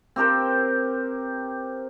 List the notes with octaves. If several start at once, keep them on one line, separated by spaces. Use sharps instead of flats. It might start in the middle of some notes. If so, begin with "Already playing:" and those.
C4 G4 A#4 C5